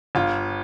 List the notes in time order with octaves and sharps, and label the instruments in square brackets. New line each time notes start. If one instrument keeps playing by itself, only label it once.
[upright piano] G1 F4